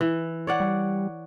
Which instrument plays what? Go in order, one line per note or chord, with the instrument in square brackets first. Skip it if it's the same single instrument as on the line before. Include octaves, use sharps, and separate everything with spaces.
[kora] E3
C#5 D5 F#5
[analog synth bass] G3